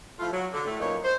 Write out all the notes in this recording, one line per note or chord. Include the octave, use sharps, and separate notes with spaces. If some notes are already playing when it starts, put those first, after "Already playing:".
F3 A3 E4 F4
F#3
D3
A2 A3
F#2 A#2 E3 A#3 D#4 C#5
C5